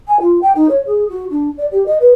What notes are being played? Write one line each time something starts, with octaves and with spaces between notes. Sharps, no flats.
G#5
F4
G5
D#4
C#5
G#4
F#4
D4
D5
G4
D#5
B4